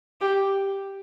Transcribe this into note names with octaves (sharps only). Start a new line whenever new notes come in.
G4